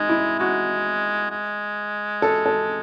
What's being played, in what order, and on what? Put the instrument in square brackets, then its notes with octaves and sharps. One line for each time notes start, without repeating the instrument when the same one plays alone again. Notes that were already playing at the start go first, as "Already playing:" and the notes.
Already playing: [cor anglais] G#3 [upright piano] D#4
[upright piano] E4
[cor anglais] G#3 [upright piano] F#4
[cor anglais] G#3
[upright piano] A4
A4